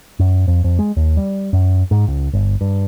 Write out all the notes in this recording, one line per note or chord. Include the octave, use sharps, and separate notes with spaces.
F#2
F2
F2
G#3
D#2
G3
F#2
G#2
C#2
G1
G2